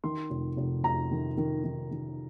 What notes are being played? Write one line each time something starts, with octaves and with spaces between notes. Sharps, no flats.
D#3 C6
F1
F1
F1 A#5
D#3
D#3
D#3
D#3